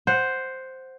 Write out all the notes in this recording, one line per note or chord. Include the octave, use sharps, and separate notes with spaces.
C5 F#5